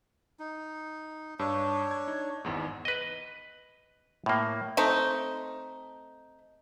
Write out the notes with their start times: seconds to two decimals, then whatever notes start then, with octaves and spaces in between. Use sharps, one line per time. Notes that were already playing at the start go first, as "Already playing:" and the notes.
0.39 D#4
1.39 G2 D4 C#5 E6
1.91 G#6
2.08 D#4
2.45 G#1 E2 G#2
2.85 B4 D#5
4.26 A2 A#3
4.77 A3 C4 D#4